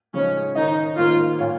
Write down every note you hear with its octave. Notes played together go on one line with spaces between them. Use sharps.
C#3 F3 G#3 C#4 D#4
D#3 C#4 D#4 A#4 D#5
G#1 G#2 D#3 A#3 D#4 F4
A#2 A#3 F4 C#5